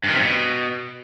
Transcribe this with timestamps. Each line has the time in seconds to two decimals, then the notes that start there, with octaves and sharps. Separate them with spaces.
0.04 G2
0.09 D#3
0.14 C3
0.19 G2
0.24 B2